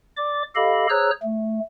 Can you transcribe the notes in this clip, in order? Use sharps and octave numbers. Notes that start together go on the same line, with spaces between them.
D5 D6
G4 A4 D#5 F5 B5
G#4 C5 C#5 A#5 E6 F#6
A3